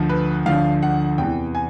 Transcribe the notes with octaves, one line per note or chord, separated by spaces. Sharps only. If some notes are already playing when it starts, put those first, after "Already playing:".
Already playing: D2 D3 F3
B4
D2 D3 F3 F5
F#5
E2 C3 E3 G5
G#5